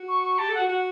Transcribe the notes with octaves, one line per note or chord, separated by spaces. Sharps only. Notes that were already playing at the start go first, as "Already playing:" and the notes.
Already playing: F#4
C#6
C#6
G4 A5
A4
F#4 F#5
F#4 F#5